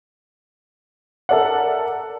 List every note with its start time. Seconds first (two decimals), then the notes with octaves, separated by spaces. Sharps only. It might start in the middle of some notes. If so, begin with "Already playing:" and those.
1.29 A4 A#4 D5 E5 F#5